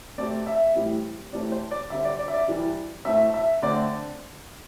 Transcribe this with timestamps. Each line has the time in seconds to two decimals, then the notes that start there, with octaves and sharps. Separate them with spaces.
0.18 C3 A3 C4 D5
0.47 E5
0.75 A2 E3 G3 C4
1.33 C3 E3 A3 C4 D5
1.52 C5
1.71 D5
1.90 D3 G3 C4 E5
2.05 D5
2.19 D5
2.28 E5
2.33 D5
2.48 C3 E3 G3
3.05 A2 A3 C4 E5
3.34 E5
3.62 D3 A3 C4 D5